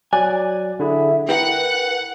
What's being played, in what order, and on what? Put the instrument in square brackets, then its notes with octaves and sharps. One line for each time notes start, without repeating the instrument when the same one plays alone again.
[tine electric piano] F#3 D5 F#6 [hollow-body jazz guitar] G#5
[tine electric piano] D3 E4 G#4 [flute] E5
[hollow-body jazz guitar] E4 G#4 A#4 [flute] B4 [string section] F#5 [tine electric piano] G5